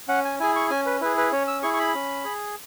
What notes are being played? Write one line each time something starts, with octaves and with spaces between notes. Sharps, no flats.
C#4 F#5
G#5
E4 G#4 G#5
C#6
C#4 G#5
B4
E4 G#4 B4
B4
C#4 C#5
E6
E4 G#4 C#6
C#6
B5
C#4
G#4